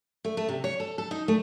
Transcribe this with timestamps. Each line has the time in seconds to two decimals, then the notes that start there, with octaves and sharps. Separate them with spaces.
0.25 A3
0.37 A3
0.48 C3
0.64 C#5
0.80 A4
0.98 A4
1.11 D#4
1.28 A3